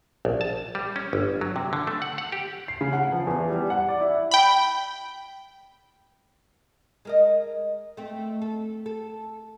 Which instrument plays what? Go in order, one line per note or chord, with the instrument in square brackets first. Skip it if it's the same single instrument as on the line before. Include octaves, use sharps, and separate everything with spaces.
[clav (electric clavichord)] A#1
A5
G3
C#4
G1
F#3
C3
D3
A3
F#5
F#5
G4
[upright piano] C7
C#3
F#5
F3
E2
G3
F#5
D5
E4
[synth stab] G5 B5
[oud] G#3 A#4 D#5
A3 C4
A4
A4